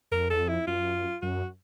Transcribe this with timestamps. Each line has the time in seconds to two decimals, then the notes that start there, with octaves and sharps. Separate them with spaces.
0.11 F2 A#4
0.30 E2 A4
0.39 F2
0.48 E4
0.67 F#2 F4
1.22 F#2 F#4